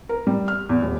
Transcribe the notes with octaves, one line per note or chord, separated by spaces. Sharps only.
A#4
G3
F6
E2
D#1